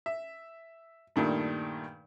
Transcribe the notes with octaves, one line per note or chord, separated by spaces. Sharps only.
E5
G2 A#2 D#3 A3